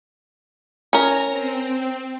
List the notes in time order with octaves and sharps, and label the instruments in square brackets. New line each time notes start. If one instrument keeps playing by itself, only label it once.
[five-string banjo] C#4 A#4 [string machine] A#5
[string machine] C4